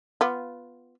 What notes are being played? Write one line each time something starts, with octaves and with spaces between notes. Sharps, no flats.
B3 F4